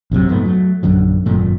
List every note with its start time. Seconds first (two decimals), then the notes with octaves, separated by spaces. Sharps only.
0.12 A#1 F#2 C3 F#3
0.28 F2 G#2 A3 B3
0.45 F#3 A3
0.83 A#1 F#2 D3 F#3
1.26 G#1 F#2 A#2 A3